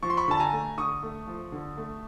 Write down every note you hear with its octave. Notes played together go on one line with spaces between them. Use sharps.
F3 C#6
C6
B5 C#6
D3 A5
G#5 A#5
A3
D3 C#6 D#6
A3
F3
D3
A3